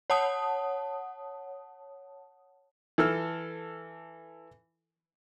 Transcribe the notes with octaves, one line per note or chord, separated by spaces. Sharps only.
C#5 F#5 A5 D#6
E3 A4 E6 F6